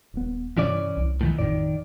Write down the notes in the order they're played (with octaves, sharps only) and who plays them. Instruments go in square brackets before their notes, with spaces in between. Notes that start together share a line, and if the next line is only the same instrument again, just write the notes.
[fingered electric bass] D#1 B3
[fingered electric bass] G2 C3 [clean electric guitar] E3 C#4 D5
[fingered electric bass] C2
[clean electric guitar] A2 D#3 E3
[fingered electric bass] G#1 F2 A2 [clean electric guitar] D#3 D5